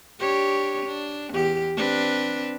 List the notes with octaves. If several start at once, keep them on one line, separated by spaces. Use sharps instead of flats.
D4 G4 C#5
D4
E2 G4
C4 D4 B4